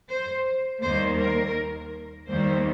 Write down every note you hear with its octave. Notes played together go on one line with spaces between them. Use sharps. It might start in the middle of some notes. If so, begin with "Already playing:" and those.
C5
D#2 D#3 G3 A#3 C5
A#4
D#2 D#3 G3 A#3 C5